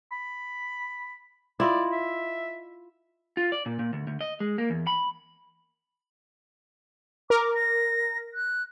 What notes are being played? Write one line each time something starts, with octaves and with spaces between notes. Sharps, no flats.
B5
E4 F4 D5 D#5
E5
F4
D5
A#2
A#2
D2
D2
D#5
G#3
A#3
E2
B5
A#4 D6
A#6
F#6